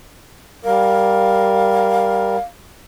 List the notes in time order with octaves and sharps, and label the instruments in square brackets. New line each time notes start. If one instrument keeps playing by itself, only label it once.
[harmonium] G3 A#4 [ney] F5